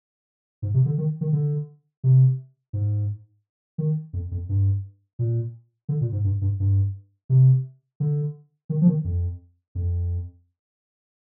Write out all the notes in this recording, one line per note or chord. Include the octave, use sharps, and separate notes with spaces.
G#2
C3
D3
D#3
D#3
D3
C3
G#2
D#3
F2
F2
G2
A#2
D3
A#2
G#2
G2
G2
G2
C3
D3
D#3
F3
D#3
F2
F2